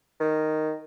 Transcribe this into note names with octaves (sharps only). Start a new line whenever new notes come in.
D#3